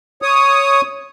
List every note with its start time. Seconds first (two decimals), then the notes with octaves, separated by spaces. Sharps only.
0.22 C#5 D#6